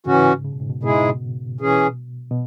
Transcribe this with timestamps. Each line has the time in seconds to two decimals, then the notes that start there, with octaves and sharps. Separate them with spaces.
0.06 G#2 C#3 E3 C#4 F#4
0.45 C#3
0.53 B2
0.60 G#2
0.69 B2
0.83 G#2 B2 G#3 E4 G#4
1.61 E3 C#4 G#4
2.31 B2